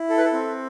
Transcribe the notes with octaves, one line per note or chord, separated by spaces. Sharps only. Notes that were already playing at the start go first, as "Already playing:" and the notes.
Already playing: E4
A4
B4
A4
C4